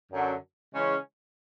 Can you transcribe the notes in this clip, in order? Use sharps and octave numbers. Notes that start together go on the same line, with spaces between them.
F#2 D3 F#3
C#3 E3 G#3 C#4